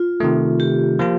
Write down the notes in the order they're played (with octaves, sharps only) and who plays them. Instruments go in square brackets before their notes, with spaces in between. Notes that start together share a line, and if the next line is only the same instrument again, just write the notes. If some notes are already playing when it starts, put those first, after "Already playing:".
Already playing: [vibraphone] F4
[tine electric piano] C3 D#3 A3
[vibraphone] G4
[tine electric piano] F3 A#3 F4